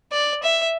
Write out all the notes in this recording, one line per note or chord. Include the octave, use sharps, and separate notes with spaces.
D5
E5